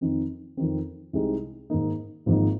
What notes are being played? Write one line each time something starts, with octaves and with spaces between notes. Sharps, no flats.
F2 D#3 C4 D#4
F2 D#3 C4
C2 C3 G#3 C4 D#4
G#2 D#3 A#3 D#4
G#1 G#2 F3 A#3 D#4